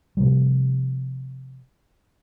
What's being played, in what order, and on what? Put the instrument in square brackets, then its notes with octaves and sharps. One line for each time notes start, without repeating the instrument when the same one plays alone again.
[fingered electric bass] C3 F3 G3